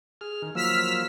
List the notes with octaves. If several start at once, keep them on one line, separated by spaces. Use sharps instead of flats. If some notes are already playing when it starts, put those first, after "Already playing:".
G#4 F6
D#3
F3 F#3 A#3 E6 F6 B6